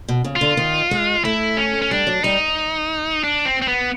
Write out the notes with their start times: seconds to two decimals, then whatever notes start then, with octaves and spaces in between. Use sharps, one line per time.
0.08 B2
0.24 C#3
0.36 F4
0.41 D3
0.57 D#3
0.91 G#3
1.24 A3 E4
1.57 C#4
1.82 C#4
1.91 G3 D4
2.07 F#3
2.24 G3 D#4
3.24 D4
3.45 C4
3.62 C4
3.68 B3